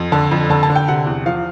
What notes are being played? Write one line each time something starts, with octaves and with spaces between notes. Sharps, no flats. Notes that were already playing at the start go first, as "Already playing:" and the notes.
Already playing: F2
D3 A5
F2
D3 A5
A5
D3
G5
C3 F#5
E2
F3 F5